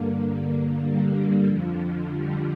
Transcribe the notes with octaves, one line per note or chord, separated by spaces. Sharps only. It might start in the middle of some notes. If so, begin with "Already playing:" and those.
Already playing: G2 D3 A#3
G3
F2 D3 F3
G3